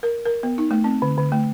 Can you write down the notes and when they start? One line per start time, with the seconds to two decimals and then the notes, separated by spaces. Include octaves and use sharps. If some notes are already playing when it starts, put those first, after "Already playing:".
0.03 A#4
0.25 A#4
0.43 B3
0.58 D#4
0.71 A3
0.84 C4
1.02 D3
1.18 D3
1.32 A3